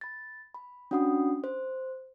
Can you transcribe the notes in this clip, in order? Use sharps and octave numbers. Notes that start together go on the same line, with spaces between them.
B5 A6
B5
C#4 D4 F#4 F#5 B5 D#6
C5